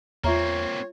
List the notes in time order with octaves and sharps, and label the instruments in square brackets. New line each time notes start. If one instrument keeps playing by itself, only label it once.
[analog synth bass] E2 [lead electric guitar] A#3 C4 [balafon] F4 E5 A#5 [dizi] C#5